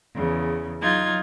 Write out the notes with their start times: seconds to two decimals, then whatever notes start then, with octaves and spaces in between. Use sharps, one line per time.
0.15 E2 C#3
0.82 F#3 D#4 F4 G#6